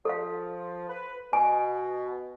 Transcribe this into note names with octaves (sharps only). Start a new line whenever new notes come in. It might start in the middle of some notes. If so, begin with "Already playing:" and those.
F3 A4 F5
B4
B2 G#5